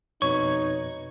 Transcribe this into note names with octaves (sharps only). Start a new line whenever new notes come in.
F2 B2 D#4 B4 C#5 C#6